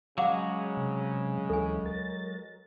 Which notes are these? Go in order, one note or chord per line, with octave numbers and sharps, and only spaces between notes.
C#3 F#3 G#3 F5 F#5 D6
C3
D2 E3 A4 G#5
A#4 A6